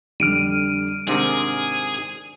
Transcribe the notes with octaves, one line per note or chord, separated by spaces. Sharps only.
F2 D3 G3 F6 D7 D#7
G#2 C3 D#3 D4 G#4